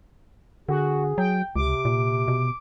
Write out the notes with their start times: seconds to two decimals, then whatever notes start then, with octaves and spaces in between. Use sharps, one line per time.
0.69 D3 F#4 G#4
1.18 F#3 G5
1.56 C#2 C3 D6
1.85 A#2
2.28 B2